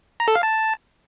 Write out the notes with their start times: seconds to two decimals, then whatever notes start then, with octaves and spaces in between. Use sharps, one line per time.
0.20 A#5
0.28 A4
0.35 F5
0.43 A5